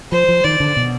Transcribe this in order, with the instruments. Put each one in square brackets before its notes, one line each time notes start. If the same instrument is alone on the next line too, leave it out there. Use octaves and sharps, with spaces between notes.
[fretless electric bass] F3 [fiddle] C5
[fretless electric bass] F3
[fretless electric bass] D#3 [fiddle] D5
[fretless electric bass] D3
B2